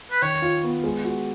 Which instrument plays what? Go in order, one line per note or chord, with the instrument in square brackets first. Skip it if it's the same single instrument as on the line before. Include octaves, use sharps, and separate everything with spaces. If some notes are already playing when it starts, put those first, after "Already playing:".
[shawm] B4
[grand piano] D#3 [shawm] C#5
[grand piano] F4
B3
G#3
F#4